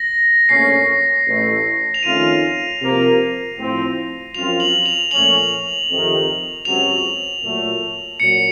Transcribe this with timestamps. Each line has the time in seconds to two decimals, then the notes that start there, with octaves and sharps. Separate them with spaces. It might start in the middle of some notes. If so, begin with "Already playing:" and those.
Already playing: A#6
0.49 A#1 A#2 A3 C#4 C7
1.27 A1 A2 A3
1.94 F7
2.03 F2 D#3 A3 C#4 F4 D#7
2.80 C3 F3 A#3
3.57 A2 F3 C4
4.35 F#2 F3 C4 F4 F7
4.60 F#7
4.86 F7
5.11 A#2 F3 A3 C#4 F#7
5.88 F2 C3 D#3
6.65 C#2 C3 F#3 F7
7.42 A#2 F#3 A3
8.19 A#2 F#3 C#7